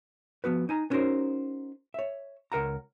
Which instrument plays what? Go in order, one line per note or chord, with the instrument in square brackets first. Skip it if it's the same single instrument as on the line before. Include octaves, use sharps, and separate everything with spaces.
[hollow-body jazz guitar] F3 B3 F#4 B4
D#4 G#5 A#5
B3 C#4 D#4 F#4 A#4 C5
C#5 E5
C#2 A#4 F#5 A#5